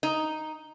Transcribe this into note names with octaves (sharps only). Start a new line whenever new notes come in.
D#4